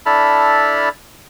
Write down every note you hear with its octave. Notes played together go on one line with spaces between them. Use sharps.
D4 E4 A4 A5 B5 F6